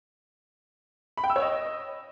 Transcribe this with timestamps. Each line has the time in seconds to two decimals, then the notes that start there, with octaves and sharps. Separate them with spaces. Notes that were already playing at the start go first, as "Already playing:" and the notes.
1.17 B5
1.24 G5
1.30 E6
1.36 C#5
1.42 D#5